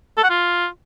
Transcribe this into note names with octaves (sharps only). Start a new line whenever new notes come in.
A4
F#5
F4